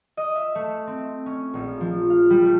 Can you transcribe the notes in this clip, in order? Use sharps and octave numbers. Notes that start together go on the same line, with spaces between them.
D#5
E5
A3
C4
C#4
A#1
F3
F5
G3
A3